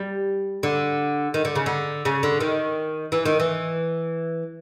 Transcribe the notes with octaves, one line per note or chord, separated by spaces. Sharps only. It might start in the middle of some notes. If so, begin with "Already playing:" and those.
Already playing: G3
D3
D#3
D3
C#3
D3
C#3
D3
D#3
E3
D#3
E3